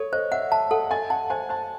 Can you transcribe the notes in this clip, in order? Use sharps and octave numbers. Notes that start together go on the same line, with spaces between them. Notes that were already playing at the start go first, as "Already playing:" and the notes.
Already playing: A4 C#5
C5 D#5
E5 F#5
E5 A5
A4 F#5
D#5 G#5
F#5 A5
C5 G#5
C5 A5